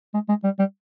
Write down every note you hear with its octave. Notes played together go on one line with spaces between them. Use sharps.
G#3
G#3
G3
G3